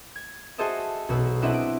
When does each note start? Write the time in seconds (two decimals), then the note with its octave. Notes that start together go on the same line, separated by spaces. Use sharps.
0.16 G#6
0.58 F#4 G#4 A4 C5 D#5 E5
1.09 B1 F#4 B4 E6
1.42 C4 D4 E4 D#5 E5 F#5
1.54 D7